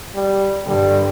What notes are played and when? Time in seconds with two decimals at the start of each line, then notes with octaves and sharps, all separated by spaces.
0.15 G3
0.67 G2 D3 G3